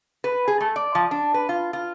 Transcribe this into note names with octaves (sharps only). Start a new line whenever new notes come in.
B4
G#4
A3
D5
F3
D4
B4
F4
F4